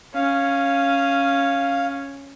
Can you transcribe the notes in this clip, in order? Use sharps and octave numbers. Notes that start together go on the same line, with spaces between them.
C#4 F5